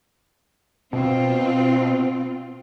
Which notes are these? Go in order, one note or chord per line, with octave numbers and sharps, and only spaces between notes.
B2 C4 F4